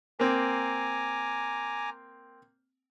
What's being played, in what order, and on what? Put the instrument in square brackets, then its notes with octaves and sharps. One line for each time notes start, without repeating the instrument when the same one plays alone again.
[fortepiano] A#3 C4 [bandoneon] G#5 A#5 D6